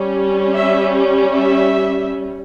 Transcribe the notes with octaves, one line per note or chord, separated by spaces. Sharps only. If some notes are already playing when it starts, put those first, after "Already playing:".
Already playing: G3 C#4
E5
E5